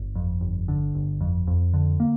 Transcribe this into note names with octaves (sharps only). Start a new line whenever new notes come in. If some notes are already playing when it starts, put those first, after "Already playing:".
Already playing: G1
F2
G1
D3
G1
F2
F2
D3
A#3